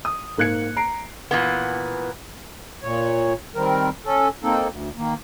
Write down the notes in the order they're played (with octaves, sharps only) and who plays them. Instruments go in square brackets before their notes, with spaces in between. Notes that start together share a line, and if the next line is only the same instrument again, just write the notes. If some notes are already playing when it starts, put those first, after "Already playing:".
[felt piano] D#6
G#2 A#3 F#6 G#6 C#7
A#5 C7 D7
[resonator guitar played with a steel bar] A#2 E3 B3
[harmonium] A#2 C#5
D#3 G3 C4 A#4
C#4 A4
A#3 C4 D#4 A4
D2
D#3 A#3